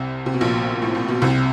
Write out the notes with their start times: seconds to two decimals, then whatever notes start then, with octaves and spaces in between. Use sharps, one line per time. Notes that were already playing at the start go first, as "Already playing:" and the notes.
Already playing: C2 C3
0.26 C3
0.34 B2
0.41 A#1 A#2
0.82 A2
0.95 A#2
1.08 B2
1.22 C2 C3